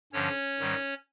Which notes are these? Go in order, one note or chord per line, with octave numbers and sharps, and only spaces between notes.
G2 D3 F3 C#4 C#5
G#2 D#3 G3